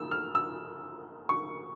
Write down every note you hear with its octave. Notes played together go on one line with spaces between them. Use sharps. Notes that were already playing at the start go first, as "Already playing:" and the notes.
Already playing: A#3 E6
F6
E6
C#6